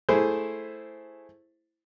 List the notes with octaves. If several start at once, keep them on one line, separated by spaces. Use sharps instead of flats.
A3 E4 G#4 C5